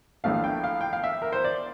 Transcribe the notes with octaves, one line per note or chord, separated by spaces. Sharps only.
A#1 A2 E3 A3 D4 F5
G5
F5
G5
F5
E5
A#4
C5
D5